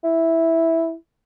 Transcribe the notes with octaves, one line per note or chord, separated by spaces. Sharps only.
E4